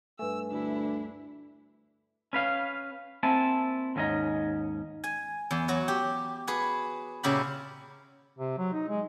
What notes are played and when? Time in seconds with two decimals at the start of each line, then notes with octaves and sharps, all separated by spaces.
0.19 G2 A3 B4 G#5 E6
0.51 D2 D4 E4
2.33 C#4 B4 F5
3.23 A#3 C4 E4 G#5 A5
3.96 D#2 G#2 C#4 D#4 D#5
5.04 G#5
5.51 E2
5.68 F#3 F#4
5.88 G4
6.47 F#4 G#4 B4
7.23 A#2 C#3 E4 F#4 G4 B5
8.38 C3
8.58 F#3
8.73 D#4
8.89 G#3